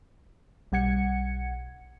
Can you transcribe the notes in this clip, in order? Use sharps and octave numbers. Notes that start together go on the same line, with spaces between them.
B1 G3 F#5 G#6 C#7